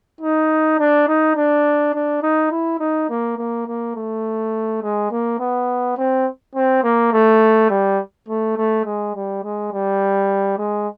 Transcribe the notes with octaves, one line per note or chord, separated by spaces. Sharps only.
D#4
D4
D#4
D4
D4
D#4
E4
D#4
A#3
A#3
A#3
A3
G#3
A#3
B3
C4
C4
A#3
A3
G3
A3
A3
G#3
G3
G#3
G3
G#3